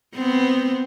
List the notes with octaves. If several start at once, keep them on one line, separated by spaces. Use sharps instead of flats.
B3 C4